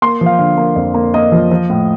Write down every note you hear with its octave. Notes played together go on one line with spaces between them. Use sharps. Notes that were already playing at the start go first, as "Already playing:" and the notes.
A#3 C6
F3
F5
D3 F5
A#3
F2
A#3
A#3 D#5
F3
F3
A2